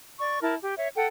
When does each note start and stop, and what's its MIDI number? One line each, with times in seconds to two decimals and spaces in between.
0.19 0.40 74
0.19 0.40 85
0.42 0.54 64
0.42 0.54 70
0.42 0.54 81
0.62 0.75 67
0.77 0.89 73
0.77 0.89 76
0.95 1.07 69
0.95 1.07 78
0.95 1.07 79